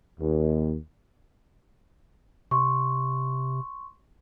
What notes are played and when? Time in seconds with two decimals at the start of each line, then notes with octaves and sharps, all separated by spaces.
0.20 D#2
2.51 C3 C6 C#6